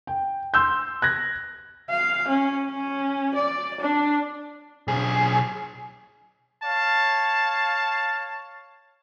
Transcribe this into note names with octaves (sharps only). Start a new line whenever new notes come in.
G5
C6 E6 G6
F#6 G#6 A#6
F5
C#4
C#4
D5
D4
B1 G#4
C#5 F5 A5